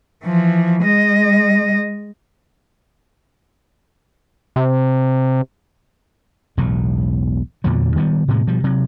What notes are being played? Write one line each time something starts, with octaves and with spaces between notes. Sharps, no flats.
E3 F3
G#3 D#5
C3
E1 B1 A2
E2 A#2 D3 F#3
D#3 G3 G#3 B3
A2 C3 D#3 G#3
B2 F3 G3
C3 F#3